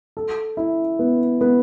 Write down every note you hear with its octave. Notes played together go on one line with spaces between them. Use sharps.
A4
E4
B3
B3